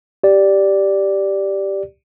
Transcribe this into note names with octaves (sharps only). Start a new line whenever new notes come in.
G4 D5